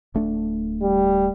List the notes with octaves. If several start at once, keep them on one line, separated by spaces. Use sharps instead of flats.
D1 A3 D4
G3